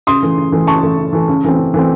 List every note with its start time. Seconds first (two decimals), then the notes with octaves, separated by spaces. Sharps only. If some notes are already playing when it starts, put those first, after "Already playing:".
0.07 C#3 C6 D#6
0.23 E3 A3
0.38 C#3
0.52 E3 A3
0.67 C#3 A5 C#6
0.83 E3 A3
0.98 C#3
1.13 E3 A3
1.28 C#3
1.44 E3 A3 C4
1.58 C#3
1.74 E3 A3 C4